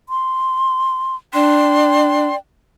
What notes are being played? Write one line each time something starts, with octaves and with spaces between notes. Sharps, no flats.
C6
D4 D5 G5 C6